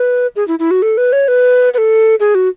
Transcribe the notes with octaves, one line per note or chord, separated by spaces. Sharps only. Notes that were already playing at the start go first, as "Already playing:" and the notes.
Already playing: B4
G#4
E4
E4
F#4
A4
B4
C#5
B4
B4
A4
G#4
F#4